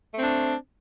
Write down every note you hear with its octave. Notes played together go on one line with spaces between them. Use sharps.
A3 C4 D4